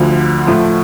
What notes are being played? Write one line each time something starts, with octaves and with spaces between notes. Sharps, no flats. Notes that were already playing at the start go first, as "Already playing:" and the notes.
Already playing: D2 D3 F3
A2 F3 A3